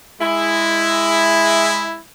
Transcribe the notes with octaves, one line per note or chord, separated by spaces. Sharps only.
G#3 E4